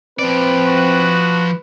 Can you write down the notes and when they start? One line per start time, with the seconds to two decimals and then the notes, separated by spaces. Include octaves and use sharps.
0.19 F3 C4 B4 D5
0.67 F#4